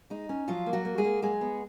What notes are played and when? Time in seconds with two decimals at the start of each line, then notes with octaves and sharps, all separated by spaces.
0.10 G#3 D#4
0.29 C#4
0.48 F3 F#3 F4
0.66 A#3
0.73 F#3 F#4
0.85 A#3
0.98 G#3 G#4
1.04 A#3
1.22 F#3 G#3 G#4
1.41 B3